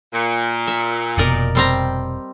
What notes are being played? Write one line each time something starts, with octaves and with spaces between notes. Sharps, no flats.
A#2
E5
F1 B2 A#4 D5 D#5
G3 C4 A#5